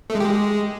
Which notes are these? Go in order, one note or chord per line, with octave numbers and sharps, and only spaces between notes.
A3
G#3
G4
G#3